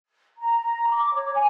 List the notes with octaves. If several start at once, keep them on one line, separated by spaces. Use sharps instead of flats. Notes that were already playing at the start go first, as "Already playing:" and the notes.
A#5
D6
C#5
G#5